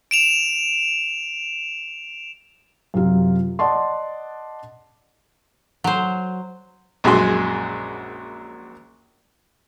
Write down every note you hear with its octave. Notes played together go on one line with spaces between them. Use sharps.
D7 E7 F7
F#2 C3 F4
D5 D#5 F#5 A5 C6
F#3 C5
A#1 F#2 G#3 F#4 G#5 C6